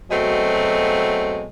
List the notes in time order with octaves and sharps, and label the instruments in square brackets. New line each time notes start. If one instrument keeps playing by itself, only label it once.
[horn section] B2 F#3 G#3 A3 C4